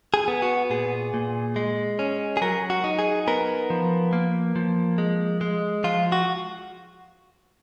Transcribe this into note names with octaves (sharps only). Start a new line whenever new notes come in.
G#4
B3
F#4
A#2 G#4
A#2
G#3
C#4
G#4
F#3 A#4
F#4
D#4
G#4
B3 A#4
F3
A#3
F3
G#3
G#3
F3 F4
F#4